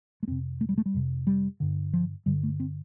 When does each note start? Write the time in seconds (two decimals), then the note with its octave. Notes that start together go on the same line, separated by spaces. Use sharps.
0.23 A3
0.28 F2 C3 C4
0.61 A3
0.69 G3
0.78 A3
0.86 G3
0.94 F2 C3
1.27 G3
1.60 G2 D3
1.93 F3
2.26 G2 D3 G3
2.43 A3
2.60 C4